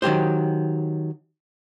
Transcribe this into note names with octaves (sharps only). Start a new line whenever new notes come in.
D#3 F#3 G4 C5